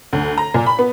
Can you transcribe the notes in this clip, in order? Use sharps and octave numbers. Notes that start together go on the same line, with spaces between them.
D2
A#5
A#2
B5
B3